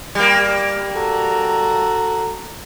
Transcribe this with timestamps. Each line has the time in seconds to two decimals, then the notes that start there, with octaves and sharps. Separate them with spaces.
0.15 G3 A#3
0.95 F#4 A4 A#5